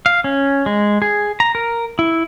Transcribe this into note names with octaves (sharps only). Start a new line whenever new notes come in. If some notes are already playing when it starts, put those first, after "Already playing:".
F5
C#4
G#3
G#4
A#5
A#4
E4